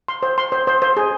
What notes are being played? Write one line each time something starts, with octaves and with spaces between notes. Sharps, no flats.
C6
C5
C6
C5
C5
C5
G#4